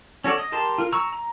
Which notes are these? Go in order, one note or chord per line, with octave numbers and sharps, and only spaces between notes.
C#4 F#4 A4 C#5 D5
D#5
G4 A#4 A5 C6
F4 A#4
A#5 C#6 E6
A#5